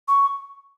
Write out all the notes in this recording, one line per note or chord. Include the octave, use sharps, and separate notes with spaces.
C#6